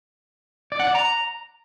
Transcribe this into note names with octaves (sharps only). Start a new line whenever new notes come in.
D5
F#5
D5
A#5